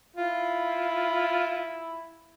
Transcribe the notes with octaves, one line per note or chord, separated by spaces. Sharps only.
E4 F4